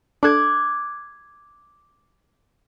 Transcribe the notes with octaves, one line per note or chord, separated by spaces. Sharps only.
D4 A4 D6 F#6 G#6